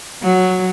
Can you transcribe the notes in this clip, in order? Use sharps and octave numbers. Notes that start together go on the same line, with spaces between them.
F#3